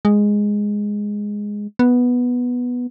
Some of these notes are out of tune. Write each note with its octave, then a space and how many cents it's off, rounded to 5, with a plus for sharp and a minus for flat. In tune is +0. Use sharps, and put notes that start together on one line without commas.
G#3 -5
B3 -5